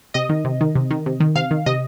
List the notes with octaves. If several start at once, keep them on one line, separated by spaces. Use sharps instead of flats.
C3 D#5
D#3
C3
D#3
C3
D#3
C3
D#3
C3 F5
D#3
C3 D#5